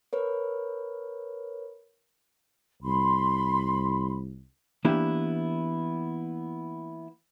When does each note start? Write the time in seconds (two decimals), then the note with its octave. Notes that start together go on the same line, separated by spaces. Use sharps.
0.13 A#4 B4 C#5
2.82 C2 B5 C6
4.85 E3 A#3 B3 D4 E4 G4